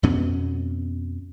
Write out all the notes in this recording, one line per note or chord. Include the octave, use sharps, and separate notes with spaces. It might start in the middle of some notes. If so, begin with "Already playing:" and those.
F2 B2 B3 C#4